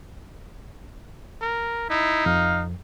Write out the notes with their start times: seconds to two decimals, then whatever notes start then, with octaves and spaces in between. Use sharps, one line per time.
1.42 A#4
1.90 D#4 E4
2.26 F2 F5